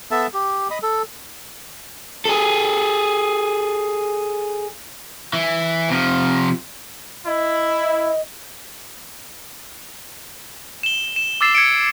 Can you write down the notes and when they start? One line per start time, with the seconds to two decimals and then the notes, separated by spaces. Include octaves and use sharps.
0.11 B3 A4 E5 A5
0.34 G4
0.71 D#5 B5 D#6
0.83 A4
2.25 G#4 A4
5.33 E3
5.90 C3 F3
7.26 E4 D#5
10.83 E7 G7
11.16 E7
11.41 D6 E6 A6 C7 E7
11.55 G#6 C#7 D7